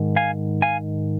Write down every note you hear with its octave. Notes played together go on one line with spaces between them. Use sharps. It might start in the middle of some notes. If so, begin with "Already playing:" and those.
Already playing: G#2 D#3
F5 G#5
F5 G#5